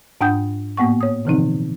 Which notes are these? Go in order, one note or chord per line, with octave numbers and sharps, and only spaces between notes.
G#2 D4 F#5 G5 D#6 G6
A2 A#3 B3 F#5 C#6
C#5 D#6
B2 D3 E3 F3 C4 D#4